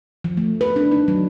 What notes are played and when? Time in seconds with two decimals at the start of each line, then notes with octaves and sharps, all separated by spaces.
0.24 F3
0.37 A3
0.61 B4
0.76 D4
0.92 D#4
1.08 F#3